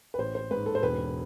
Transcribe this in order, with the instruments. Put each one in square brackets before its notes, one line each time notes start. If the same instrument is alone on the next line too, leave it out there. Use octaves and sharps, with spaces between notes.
[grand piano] B4
A1 C5
C5
G#2 B4
A4
C5
E1 B4